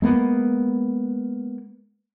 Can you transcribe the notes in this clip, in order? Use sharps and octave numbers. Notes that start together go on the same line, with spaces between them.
G#3 A#3 B3